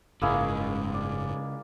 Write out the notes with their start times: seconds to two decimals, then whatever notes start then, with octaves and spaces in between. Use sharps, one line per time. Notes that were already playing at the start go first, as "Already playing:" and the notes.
0.22 F#1 G#2 C#3 G#3 A#3 E4 G#4
0.94 D5